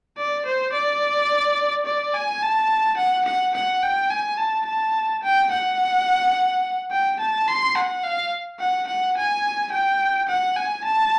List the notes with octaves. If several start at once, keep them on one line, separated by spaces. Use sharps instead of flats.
D5
C5
D5
D5
G#5
A5
F#5
F#5
F#5
G5
G#5
A5
A5
G5
F#5
G5
A5
C6
F#5
F5
F#5
F#5
G#5
G5
F#5
G#5
A5